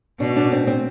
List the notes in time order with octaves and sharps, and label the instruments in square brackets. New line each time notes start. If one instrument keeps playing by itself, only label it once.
[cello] B2 [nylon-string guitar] D4
[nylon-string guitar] D4
C4
C4